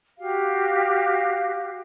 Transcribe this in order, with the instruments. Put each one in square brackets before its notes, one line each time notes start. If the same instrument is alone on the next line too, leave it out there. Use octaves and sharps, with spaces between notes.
[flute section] F#4 G4 F5